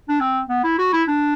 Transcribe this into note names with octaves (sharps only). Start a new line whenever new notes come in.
D4
C4
B3
E4
F#4
E4
D4